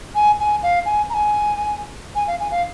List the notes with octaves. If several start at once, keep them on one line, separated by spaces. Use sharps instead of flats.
G#5
G#5
F5
G#5
A#5
G#5
G#5
F5
G#5
F5